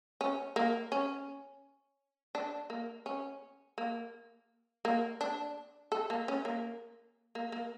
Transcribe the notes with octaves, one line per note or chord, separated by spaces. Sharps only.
C#4
A#3
C#4
D4
A#3
C#4
A#3
A#3
D4
A4
A#3
C#4
A#3
A#3
A#3